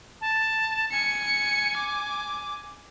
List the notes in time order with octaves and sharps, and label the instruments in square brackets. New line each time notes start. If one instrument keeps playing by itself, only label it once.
[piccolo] A5
[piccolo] G#5 [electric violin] C#7
[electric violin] D6